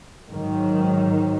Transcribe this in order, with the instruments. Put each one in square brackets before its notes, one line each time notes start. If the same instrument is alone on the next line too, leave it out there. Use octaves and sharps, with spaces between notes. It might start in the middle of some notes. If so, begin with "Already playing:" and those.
[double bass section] G#2 D#3 F#3